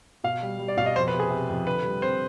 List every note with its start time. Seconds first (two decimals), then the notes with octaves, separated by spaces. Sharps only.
0.24 B2 F5
0.43 G3
0.59 G3
0.68 D5
0.77 B2 F5
0.86 D#5
0.95 F2 C5
1.08 B4
1.14 C3
1.20 G#4
1.30 C3
1.49 F2
1.66 D3 B4
1.84 G3
2.02 C4 C5